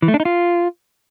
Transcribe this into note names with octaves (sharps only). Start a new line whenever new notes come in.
E3
A3
D4
D#4
F4